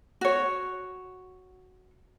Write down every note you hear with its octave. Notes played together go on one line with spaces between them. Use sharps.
F#4 C#5